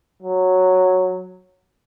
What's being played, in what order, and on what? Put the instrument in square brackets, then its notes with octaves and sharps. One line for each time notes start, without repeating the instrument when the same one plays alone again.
[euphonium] F#3